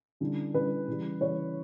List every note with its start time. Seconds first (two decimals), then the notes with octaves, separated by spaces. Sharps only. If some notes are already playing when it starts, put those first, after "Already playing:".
0.20 D3 G3 C#4 E4
0.54 D3 G3 C#4 E4 B4
0.88 C#3 E3 G3
1.21 C#3 E3 G3 C#5